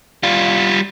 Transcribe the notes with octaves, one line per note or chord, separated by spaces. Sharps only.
G3 F4